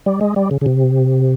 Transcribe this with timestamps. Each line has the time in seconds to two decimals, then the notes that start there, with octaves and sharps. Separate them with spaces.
0.06 G3
0.21 G#3
0.36 G3
0.51 C#3
0.61 C#3
0.66 C3